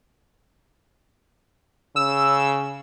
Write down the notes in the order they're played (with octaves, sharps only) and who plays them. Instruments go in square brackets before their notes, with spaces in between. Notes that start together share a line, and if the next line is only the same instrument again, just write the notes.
[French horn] C#3 [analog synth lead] E6